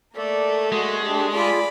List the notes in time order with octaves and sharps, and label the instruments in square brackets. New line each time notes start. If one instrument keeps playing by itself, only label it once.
[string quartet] A3 A#3 [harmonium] A4 D5
[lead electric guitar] G#3 [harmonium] F#4
[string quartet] A3 D4 [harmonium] G4
[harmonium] F4 G#4 [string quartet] D5 B5